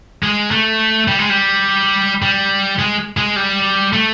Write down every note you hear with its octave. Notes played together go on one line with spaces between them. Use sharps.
G#3
A3
G3
G#3
G3
G3
G#3
G#3
G3
A3